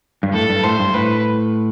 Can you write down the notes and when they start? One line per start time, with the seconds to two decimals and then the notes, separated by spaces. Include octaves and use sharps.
0.23 G2
0.34 A2 A4
0.50 G2
0.64 A2 C5
0.79 G2
0.94 A2 B4